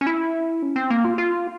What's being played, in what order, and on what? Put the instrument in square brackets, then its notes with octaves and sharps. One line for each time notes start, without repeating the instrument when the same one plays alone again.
[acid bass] C#4
E4
C#4
C4
A#3
F4
F4